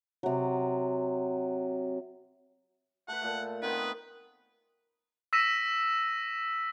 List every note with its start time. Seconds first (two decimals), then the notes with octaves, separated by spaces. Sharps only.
0.23 C3 F#3
3.08 A3 B4 F#5
3.22 A#2 A3
3.62 D#3 B3 C4 B4
5.33 E6 A#6 B6 D#7 E7